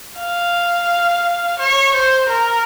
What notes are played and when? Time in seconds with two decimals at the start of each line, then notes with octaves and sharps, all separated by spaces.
0.19 F5
1.59 C#5
1.94 C5
2.29 A#4